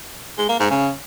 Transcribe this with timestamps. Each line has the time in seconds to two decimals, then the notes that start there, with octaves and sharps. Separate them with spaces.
0.38 G#3
0.49 A#3
0.59 G#2
0.70 C#3